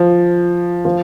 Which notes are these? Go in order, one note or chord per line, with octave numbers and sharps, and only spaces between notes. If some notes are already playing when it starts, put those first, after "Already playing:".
Already playing: F3
F3